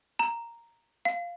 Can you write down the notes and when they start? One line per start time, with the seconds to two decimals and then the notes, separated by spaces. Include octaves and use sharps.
0.19 A#5
1.05 F5